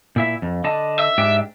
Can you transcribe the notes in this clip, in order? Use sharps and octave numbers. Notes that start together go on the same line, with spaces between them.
A#2 E4 E5
F2
D3 D#5 A5
E5
G#2 D4 G4